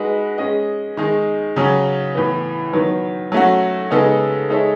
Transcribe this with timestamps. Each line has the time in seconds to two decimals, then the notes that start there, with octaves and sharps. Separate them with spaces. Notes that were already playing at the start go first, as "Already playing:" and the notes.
Already playing: G#3 D#4 F#4 B4
0.38 G#3 C#4 G#4 D#5
0.97 D#3 G#3 D#4
1.56 C#3 F#3 C#4
2.15 A2 E3 B3
2.73 D#3 F#3 B3
3.32 F#3 A3 C#4 F#4
3.91 C#3 G#3 B3 D#4 A4
4.50 G#3 D#4 A4 C#5 E5